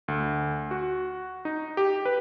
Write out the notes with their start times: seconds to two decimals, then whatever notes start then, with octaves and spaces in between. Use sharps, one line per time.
0.08 D2
0.71 F#4
1.45 D#4
1.77 G4
2.05 B4